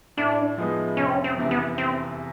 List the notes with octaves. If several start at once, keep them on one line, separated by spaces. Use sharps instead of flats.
A2 D4
F3 G#3 B3 D#4
F1 C#4
C4
C#4
C4
E2 C3
B3
C4